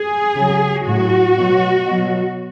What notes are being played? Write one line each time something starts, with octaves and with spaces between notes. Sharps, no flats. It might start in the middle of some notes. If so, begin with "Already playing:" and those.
Already playing: G#4
C#3 F#3
A2 F#3 F#4
B2 F#3
B2 F#3